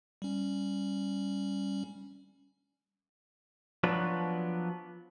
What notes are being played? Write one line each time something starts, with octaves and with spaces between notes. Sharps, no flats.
G3 C#4
F3 F#3 B3 D4 B4